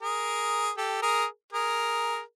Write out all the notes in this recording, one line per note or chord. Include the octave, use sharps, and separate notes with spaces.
G#4 A#4
G4 A4
G#4 A#4
G#4 A#4